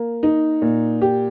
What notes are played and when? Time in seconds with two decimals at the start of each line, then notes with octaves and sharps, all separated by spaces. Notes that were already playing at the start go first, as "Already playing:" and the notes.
Already playing: A#3
0.23 D#4
0.62 A#2
1.02 G4